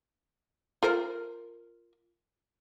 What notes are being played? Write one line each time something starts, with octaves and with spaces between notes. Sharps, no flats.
F4 A#4 C5